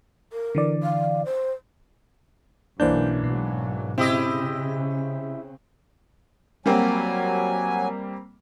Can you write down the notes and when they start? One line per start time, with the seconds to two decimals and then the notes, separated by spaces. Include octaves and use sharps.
0.32 A#4
0.55 D3 E3 D5
0.83 F5
1.25 C5
2.80 B1 F#2 E3 A#3 D4 C5 D5 G6
3.24 G#2 B2 F#3
3.98 C#3 C4 E4 G4 D#5
6.66 F#3 G3 A#3 C4 G#5